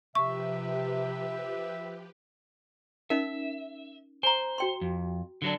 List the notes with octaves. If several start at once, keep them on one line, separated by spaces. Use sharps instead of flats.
C3 F3 G4 B4 E5 C#6
C#4 D#4 A#4 E5
C5 G#5 A#5
F#4 G5 C6
F2
D3 F#3 D4